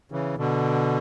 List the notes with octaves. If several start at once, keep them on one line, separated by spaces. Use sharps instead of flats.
C#3 E3
B2 D3